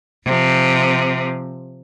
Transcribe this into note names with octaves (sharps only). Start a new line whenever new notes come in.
C3 F3